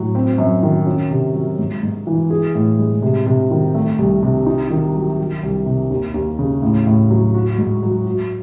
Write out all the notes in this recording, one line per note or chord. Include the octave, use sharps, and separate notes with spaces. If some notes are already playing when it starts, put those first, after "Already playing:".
Already playing: A2 F#3
C4
F#2
D#3
C#4
C3
F#3
G#2
G#2
E3
G#4
A2
G#3
C3
C3
D#3
A3
C2
C3
D#4
D#3
F#3
F#3
C2
C3
D#2
D#2
C#3
A2
A2
F#3
F#4
G#2
F#3
F#4